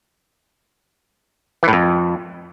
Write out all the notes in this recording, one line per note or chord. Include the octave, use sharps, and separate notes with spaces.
E3
A2
F2